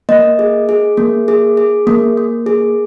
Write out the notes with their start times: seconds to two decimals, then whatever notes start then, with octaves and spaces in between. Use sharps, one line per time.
0.09 A#3 D#5
0.39 G#4
0.69 G#4
0.97 A#3
1.28 G#4
1.57 G#4
1.87 A#3
2.17 A#3
2.46 G#4